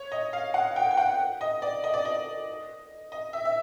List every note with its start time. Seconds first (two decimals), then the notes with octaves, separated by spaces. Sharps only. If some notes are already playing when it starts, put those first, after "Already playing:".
Already playing: C#5
0.12 D#5
0.33 F5
0.54 F#5
0.76 G5
0.91 G5
0.97 F#5
1.41 D#5
1.62 D5
1.84 D#5
1.94 D5
2.05 D#5
3.12 D#5
3.33 E5
3.45 E5